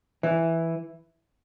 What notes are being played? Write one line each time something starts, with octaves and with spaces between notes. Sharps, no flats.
E3